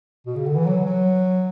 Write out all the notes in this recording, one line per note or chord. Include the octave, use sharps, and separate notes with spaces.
B2
C#3
D3
E3
F#3
F#3